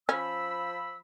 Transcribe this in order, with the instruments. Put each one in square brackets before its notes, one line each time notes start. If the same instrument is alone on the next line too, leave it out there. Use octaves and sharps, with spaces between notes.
[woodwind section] F3 B5 E6 [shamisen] C#4